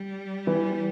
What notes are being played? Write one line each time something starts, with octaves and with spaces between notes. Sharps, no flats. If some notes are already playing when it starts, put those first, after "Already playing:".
Already playing: G3
E3